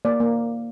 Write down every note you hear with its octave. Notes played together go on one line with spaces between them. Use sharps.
A#3 D5
A#3